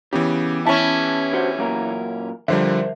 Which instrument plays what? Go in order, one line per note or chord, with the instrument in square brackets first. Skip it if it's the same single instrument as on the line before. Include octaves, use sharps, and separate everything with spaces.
[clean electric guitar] C#3 [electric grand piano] E3 B3 G4
[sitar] C#4 E4 [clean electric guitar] A5
[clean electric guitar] D3 F#4 C5
F#2 A#2 A#4
[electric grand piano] D3 F3 G3 [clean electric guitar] A#4 C5 E5